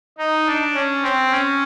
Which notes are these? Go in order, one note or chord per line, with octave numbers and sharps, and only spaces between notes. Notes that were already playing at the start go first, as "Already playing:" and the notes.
D#4
D4
C#4
C4
C#4